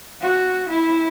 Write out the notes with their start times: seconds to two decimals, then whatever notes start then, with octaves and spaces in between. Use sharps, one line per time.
0.21 F#4
0.69 E4